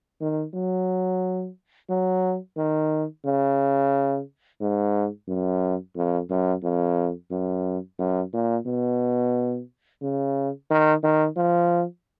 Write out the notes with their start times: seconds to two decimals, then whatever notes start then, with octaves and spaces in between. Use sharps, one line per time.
0.21 D#3
0.54 F#3
1.90 F#3
2.57 D#3
3.26 C#3
4.61 G#2
5.28 F#2
5.96 F2
6.30 F#2
6.63 F2
7.31 F#2
7.99 F#2
8.34 A#2
8.67 B2
10.02 C#3
10.70 D#3
11.03 D#3
11.37 F3